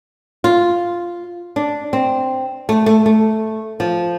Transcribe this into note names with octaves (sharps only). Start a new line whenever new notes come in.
F4
D4
C4
A3
A3
A3
F3